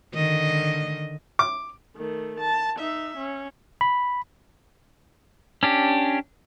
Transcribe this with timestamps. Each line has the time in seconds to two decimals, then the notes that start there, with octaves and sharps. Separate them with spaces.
0.14 D3 D#3 D#5
1.39 D6
1.97 D#3 A3
2.40 A5
2.78 D#4 E5
3.17 C#4
3.81 B5
5.63 C#4 D4 G4